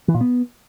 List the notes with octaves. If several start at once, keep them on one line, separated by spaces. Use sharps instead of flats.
E3
A#2
B3